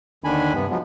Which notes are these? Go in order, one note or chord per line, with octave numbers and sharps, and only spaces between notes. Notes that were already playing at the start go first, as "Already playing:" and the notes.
D#2 D3 D#3 D4 G#5 B5
G2 C3 B3
F3 F#3 G#3 B3